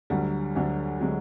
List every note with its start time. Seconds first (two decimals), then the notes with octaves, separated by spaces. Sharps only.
0.10 D2 D3 F#3 G3
0.55 D2 D3 F#3
1.01 D3 F#3 G#3